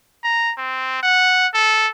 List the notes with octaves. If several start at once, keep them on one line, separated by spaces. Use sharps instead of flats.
A#5
C4
F#5
A4